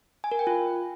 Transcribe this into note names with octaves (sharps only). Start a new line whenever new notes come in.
G#5
A#4
G5
F4